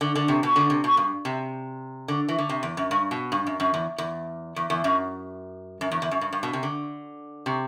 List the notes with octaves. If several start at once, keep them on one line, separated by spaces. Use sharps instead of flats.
D3
D3
C3
B2
D3
C3
B2
G2
C3
D3
E3
D3
C3
E2
F#2
G2
B2
G2
F#2
F#2
E2
E2
E2
E2
F#2
F#2
E2
E2
F#2
G2
G2
B2
C3
D3
C3